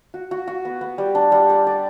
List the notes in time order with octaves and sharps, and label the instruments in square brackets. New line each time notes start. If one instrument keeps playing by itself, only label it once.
[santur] F#4
F#4
F#4
B3
B3
G3
D4
G3
D5
D5